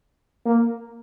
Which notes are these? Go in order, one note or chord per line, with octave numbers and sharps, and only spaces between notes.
A#3